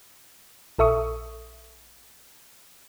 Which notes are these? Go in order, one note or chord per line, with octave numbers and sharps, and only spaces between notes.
A#1 A4 E5 C#6 D#6